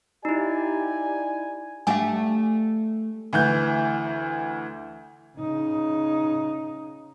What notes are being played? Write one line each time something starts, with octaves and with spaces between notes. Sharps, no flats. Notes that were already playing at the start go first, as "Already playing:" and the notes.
D#4 E4 G4 D5 G#5
A3 D4 G4 F5 G#5
D2 E3 G6
C#3 D#4